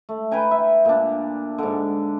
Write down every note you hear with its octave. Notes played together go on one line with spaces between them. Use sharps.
A3
B4 G5 G#5 A#5
E5
A#2 D4
G#2 D3